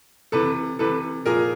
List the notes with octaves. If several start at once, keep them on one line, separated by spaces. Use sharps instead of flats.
C3 E3 A4 B4
C3 E3 A4 B4
A#2 F3 G#4 A#4